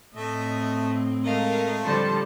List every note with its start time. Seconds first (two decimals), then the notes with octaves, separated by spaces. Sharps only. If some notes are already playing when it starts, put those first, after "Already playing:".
0.16 A2 A3 C4 D#5 E5
1.24 G#3 A3 A#4 D#5 F5
1.83 D3 F3 G3 A4 C5 A5